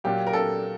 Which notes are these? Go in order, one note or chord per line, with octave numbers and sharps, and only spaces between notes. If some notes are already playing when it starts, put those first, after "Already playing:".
A#2 F#3 A#3 G4
A#4
A4